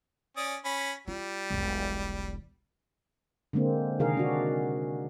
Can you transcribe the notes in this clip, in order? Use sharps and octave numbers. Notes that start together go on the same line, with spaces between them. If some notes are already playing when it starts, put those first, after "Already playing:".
C#4 D5 D#6
C#4 B5
G3 F4
E1 B1
D3 G#3 A#3 C4
C3 D#3 G#4 A#4 F5
D4 F#4